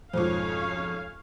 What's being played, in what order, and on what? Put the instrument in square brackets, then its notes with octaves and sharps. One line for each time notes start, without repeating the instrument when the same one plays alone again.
[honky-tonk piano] F2 G#2 B2 [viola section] C#4 C#5 F5 [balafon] F4 C5